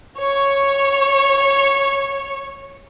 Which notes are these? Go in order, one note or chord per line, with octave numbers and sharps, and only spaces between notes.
C#5 C#6